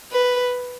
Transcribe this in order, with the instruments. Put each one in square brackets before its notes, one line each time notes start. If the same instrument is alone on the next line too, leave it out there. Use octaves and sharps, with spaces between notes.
[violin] B4